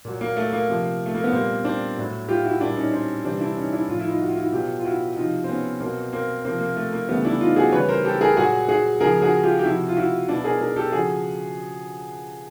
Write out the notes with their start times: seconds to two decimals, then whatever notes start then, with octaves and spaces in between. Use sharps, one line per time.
0.05 A#2 F#3
0.21 A#3
0.37 A3
0.53 A#3
0.69 C3 F3
1.06 A3
1.14 A#3
1.24 B3
1.33 A#2 G3 A#3 C4
1.65 C4 D4
1.97 A2 F#3
2.29 F4 G4
2.44 E4 F#4
2.61 A#2 G3 D4 E4
2.77 C#4 D#4
2.93 C4 D4
3.24 C3 E3 G3 C4 D4
3.41 D4 E4
3.57 C#4 D#4
3.73 D4 E4
3.89 A2 F3 F4
3.99 E4
4.09 D#4 F4
4.21 F#4
4.29 F4
4.37 E4 F#4
4.53 B2 F#3 F4 G4
4.79 F4
4.85 E4 F#4
5.16 C3 F3 D#4 F4
5.44 C4
5.48 B3 C#4
5.80 B2 F#3 A#3 C4
6.13 A#3 C4
6.44 C3 F3 A#3 C4
6.61 A#3
6.76 A3
6.93 A#3
7.08 C#3 E3 G3 A3 B3
7.25 D4 E4
7.41 D#4 F4
7.56 F#4 G#4
7.72 C#3 E3 G3 B4 C#5
7.88 A#4 C5
8.05 G4 A4
8.21 G#4 A#4
8.37 A#2 F#3 F#4 G#4
8.69 F#4 G#4
9.00 C#3 F3 G#4 A#4
9.22 F#4 G#4
9.43 F4 G4
9.59 G4
9.65 C3 F3 E4 F#4
9.89 F4
9.97 E4 F#4
10.28 B2 F#3 D4 E4
10.44 G#4 A#4
10.61 G#4 A#4
10.76 G4 A4
10.92 C#3 F3 F#4 G#4